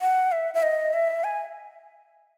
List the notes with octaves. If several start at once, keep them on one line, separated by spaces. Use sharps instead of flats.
F#5
E5
E5
D#5
E5
G#5